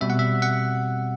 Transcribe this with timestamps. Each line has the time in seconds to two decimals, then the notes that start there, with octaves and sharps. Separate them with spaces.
0.01 B2 G3 C4 E5
0.10 F#5
0.19 E5
0.42 F#5